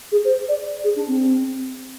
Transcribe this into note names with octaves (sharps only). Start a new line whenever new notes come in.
G#4
C5
D5
G#4
D4
C4